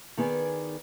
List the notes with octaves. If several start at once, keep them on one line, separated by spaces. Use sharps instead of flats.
D#3 B3 G#4 D5